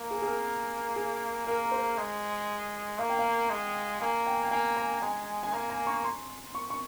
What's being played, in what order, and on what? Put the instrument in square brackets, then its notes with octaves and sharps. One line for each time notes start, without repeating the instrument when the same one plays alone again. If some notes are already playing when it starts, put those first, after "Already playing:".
Already playing: [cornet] A#3
[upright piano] G#4
G#4
A#4
G#4
[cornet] A#3 [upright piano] A#4
[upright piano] C5
[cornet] G#3
[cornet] A#3 [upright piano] F5
[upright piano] G5
F5
[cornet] G#3
[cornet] A#3 [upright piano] G#5
[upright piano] G5
G5
[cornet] A#3 [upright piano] G#5
[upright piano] A#5
[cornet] G#3 [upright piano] G#5
[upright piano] G#5
[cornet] A#3 [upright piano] A#5
[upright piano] A#5
C#6
C6
C#6
C#6